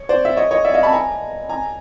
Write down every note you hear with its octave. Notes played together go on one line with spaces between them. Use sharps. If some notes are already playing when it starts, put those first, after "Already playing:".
Already playing: C#5
C5 D5
E5
C#5 D#5
C#5 D#5
D5 E5
D#5 F5
A5 B5
G#5 A#5
G#5 A#5